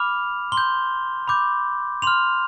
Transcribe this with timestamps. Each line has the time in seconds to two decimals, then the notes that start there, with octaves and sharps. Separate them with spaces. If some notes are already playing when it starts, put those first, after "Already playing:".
Already playing: B5 D6 F6 F7
0.52 C6 G7
0.57 G6
1.28 B5 D6 G6
2.02 C6 F6 F7